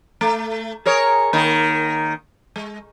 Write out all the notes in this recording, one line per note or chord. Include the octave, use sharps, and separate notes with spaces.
A3
G#4 A#4 C#5
D#3 A#3
G#3